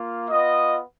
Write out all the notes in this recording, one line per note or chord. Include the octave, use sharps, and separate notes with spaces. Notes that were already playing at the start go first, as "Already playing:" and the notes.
Already playing: A#3 F4
B3 F4 D#5